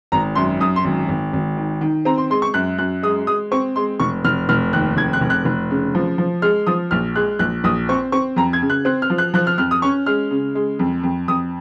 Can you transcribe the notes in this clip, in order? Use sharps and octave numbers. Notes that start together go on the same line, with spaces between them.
G#1 A#5
F#2 C6
F#2 D#6
C6
G#1
G#1
G#1
D#3
D#3
C4 A#5
C6
G#3 C6
C#6
F#2 F#6
F#2 F#6
G#3 D#6
G#3 D#6
C4 C#6
G#3 C6
F1 C#6
F1 F6
F1 F6
D#2 F#6
F1 G#6
F#6
F1
F#6
F1
C#3
F3
F3
G#3 F6
F3 D#6
A#1 F6
G#3 F#6
A#1 F#6
A#1 D#6
C4 C#6
C4 C#6
F2 A#5
G#6
C#3
F#6
C4 F#6
F6
F3
F#6
F3 F#6
F6
F2 F6
D#6
C#4 C#6
G#3 F6
C#3
G#3
F2
F2
F2 D#6